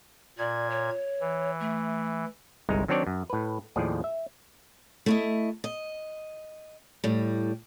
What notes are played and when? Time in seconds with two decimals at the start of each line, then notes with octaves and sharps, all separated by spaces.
0.38 A#2 D5 G#6
0.70 C#5
1.21 E3
1.60 A3
2.69 G1 C2 G#3 D#4 A#5
2.88 D#3 F#3 C4 D4 C#5 D5
3.07 F#2
3.30 A2 B4
3.76 D#2 A2 F3 G#4 D5
4.04 E5
5.06 A3 E4 D#5
5.64 D#5
7.04 A2 G3